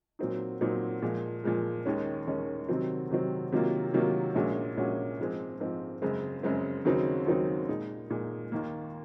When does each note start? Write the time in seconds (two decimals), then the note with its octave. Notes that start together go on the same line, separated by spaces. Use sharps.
0.19 A#2 F#3 C4 D#4
0.61 A#2 F#3 C4 D#4
1.02 A#2 F3 G#3
1.44 A#2 F3 G#3
1.86 D#2 D#3 G#3 C#4
2.27 D#2 D#3 G#3 C#4
2.69 C3 D#3 F#3 C4
3.11 C3 D#3 F#3 C4
3.52 C3 D#3 F#3 A#3 F4
3.94 C3 D#3 F#3 A#3 F4
4.35 A#1 A#2 G#3 C#4 F#4
4.77 A#1 A#2 G#3 C#4 F#4
5.19 G#2 F3 G#3 C4
5.60 G#2 F3 G#3 C4
6.02 F#2 C#3 G#3 C4
6.43 F#2 C#3 G#3 C4
6.85 D#2 C#3 F#3 C4 D#4
7.26 D#2 C#3 F#3 C4 D#4
7.69 A#2 G#3 D#4
8.10 A#2 G#3 D#4
8.52 D#2 D#3 A#3